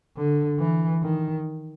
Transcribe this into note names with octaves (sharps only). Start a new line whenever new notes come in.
D3
E3
D#3